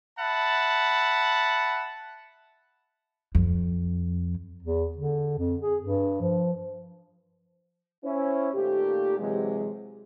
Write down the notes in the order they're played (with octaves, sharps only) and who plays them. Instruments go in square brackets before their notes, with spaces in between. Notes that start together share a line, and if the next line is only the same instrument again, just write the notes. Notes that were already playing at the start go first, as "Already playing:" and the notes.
[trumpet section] E5 F#5 A5 B5
[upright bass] F2
[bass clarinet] E2
D3
F2
G#4
G2
F3
[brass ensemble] C#4 E4 C5
A#2 D#3 A3 A#3 G4
C3 E3 F#3 G#3